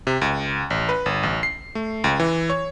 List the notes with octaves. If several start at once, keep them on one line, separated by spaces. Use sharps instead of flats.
C3
C#2
A1
B4
G1
A1
C7
A3
C#2
E3
C#5